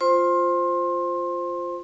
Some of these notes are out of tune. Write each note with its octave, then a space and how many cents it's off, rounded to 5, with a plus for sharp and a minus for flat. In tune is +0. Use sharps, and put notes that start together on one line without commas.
F4 +0 C5 +0 C6 +25